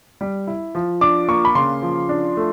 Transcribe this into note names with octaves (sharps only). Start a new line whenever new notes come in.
G3
E4
F3
D4 D6
A#3 C#6
B5
C#3 C6
F3
D4
A3